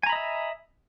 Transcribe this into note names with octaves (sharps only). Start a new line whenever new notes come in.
D#5 E5 G#5 A#5 B5